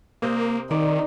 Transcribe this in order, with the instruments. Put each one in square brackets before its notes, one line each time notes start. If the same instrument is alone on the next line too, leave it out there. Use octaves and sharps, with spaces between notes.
[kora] C3 C5 D#5 [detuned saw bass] A#3
[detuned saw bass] D#3 [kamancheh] D#4 [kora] D5